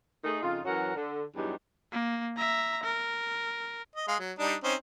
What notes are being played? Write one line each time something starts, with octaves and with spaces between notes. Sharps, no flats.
A3 D#4 G#4
F2 C#3 D#4 F4
F#2 E3 F#3 C#4 A#4 F#5
D3
E2 G2 E3 F#3 G3 D#4
A#3
E5 A#5
A#4
D#5
G#3 F5
F#3
G3 D4 D#4
C4 C#4 D#4